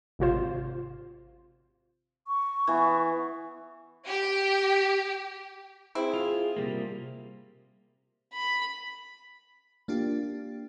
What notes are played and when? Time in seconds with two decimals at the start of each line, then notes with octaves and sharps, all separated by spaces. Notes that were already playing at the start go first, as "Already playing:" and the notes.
0.19 G#1 C3 F4 C5
2.27 C#6
2.67 E3 B3
4.07 G4
5.95 C4 E4 G#4
6.14 F4
6.56 C3 G3 A#3
8.33 B5
9.88 A#3 D4 F4 G4